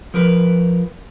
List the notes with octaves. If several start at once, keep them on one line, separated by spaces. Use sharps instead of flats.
F3 A#4 B4